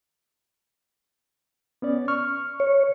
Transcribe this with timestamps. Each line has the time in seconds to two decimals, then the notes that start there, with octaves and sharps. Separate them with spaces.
1.82 B3 C#4 D5
2.08 C#6 F6
2.60 C#5